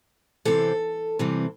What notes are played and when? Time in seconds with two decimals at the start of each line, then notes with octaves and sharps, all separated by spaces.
0.45 C3 E3 C4 A4
1.19 C3 E3 G3 C4